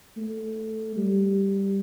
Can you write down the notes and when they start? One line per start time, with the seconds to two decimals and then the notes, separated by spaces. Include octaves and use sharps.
0.17 A3
0.97 G3